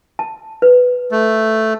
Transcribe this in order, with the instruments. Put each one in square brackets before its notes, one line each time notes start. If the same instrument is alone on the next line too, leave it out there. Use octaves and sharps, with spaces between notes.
[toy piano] A5
B4
[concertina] A3